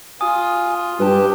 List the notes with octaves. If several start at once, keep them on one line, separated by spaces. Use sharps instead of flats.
F4 G#5 D#6
G2 G4 B4 A5